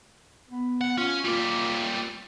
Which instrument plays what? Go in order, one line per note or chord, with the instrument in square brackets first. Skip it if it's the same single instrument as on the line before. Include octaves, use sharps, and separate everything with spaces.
[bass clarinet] B3
[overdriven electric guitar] F#5
[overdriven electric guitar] C#4 [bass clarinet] F4
[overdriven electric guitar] G3 A#3 [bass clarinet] F4